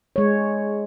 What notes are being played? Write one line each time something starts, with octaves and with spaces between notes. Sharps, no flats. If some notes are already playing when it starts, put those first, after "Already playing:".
G#3 C#5